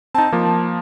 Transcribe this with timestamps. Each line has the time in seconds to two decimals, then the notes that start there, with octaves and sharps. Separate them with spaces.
0.14 C4 D#4 A5
0.33 F3 A#3